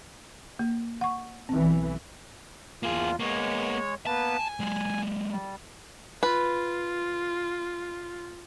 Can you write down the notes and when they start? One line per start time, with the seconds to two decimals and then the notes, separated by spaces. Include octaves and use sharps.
0.59 A#3
1.01 F#5 C#6
1.49 B1 E3 C4
2.83 E2 A#3 F4 G#4
3.20 G#3 A#3 B3 C#5
4.06 A#3 B3 B4 A5
4.38 G#5
4.60 F#3 G#3
5.31 G3
6.23 F4 B4